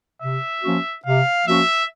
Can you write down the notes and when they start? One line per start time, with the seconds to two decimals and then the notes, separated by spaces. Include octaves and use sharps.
0.22 C3 E5
0.63 F3 A#3 C#4 F#4
1.05 C3 F5
1.46 F3 A#3 C#4 F#4 E5